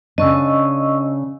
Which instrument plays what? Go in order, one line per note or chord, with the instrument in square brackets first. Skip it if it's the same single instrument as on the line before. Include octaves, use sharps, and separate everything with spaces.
[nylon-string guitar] C#3 D4 [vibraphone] D#5 C#6 E6